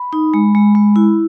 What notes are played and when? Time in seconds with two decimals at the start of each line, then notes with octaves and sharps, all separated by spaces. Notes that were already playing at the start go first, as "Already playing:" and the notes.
Already playing: B5
0.13 D#4
0.34 G#3
0.55 G#3
0.75 G#3
0.96 E4